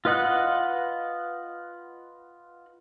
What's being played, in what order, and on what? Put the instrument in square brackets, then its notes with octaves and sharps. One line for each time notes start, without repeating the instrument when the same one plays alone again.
[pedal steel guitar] F4 B4 D#5 F#5 F#6